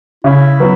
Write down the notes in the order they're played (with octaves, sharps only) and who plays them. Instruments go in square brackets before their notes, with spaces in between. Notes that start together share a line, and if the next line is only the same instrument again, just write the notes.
[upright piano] C#3 [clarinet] E4
[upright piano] F#3 B3